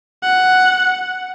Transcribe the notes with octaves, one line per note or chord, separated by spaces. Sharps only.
F#5